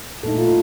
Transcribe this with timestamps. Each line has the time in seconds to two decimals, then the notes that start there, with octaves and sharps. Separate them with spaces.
0.23 A#2 A3 D#4 A4
0.38 F4